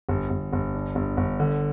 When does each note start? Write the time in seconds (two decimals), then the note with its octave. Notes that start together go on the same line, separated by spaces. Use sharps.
0.09 G1
0.30 G1
0.53 G1
0.75 D4
0.95 G1
1.17 G1
1.40 D3